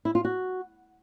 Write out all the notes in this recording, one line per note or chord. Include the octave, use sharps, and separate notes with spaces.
E4
F4
F#4